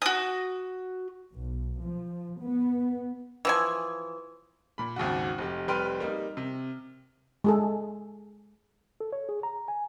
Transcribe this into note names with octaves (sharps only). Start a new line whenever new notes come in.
F#4 D#6
B1
F3
B3
E3 F3 G#5
A#2 B5
G#1 D#2 C#3 F#4
F1 G4
F1 G3 B4 G5 C6 F6
G3 A#3 D#4
C3
G#3 G#4 A4
A4
C#5
G#4
A#5
G#5